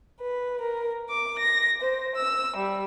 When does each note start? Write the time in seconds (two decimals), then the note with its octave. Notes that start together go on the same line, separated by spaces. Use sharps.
0.21 B4
0.61 A#4
1.10 D6
1.39 A#6
1.82 C5
2.17 E6
2.57 G3